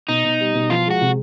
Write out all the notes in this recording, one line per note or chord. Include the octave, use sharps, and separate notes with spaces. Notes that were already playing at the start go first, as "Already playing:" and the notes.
B2 D#4
B2
G3
B2
F3 F4
G#3 F#4
C3